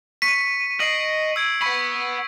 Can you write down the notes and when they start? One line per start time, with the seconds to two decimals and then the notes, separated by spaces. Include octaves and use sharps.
0.22 C#6 B6 C#7 D#7
0.80 D#5 C7 D7 F#7
1.36 E6 G#6 D7
1.62 F#5 B5 C#6 B6